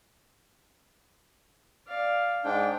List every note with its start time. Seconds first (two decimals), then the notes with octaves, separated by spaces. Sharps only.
1.87 D5 F5
2.45 G#2 D4 G5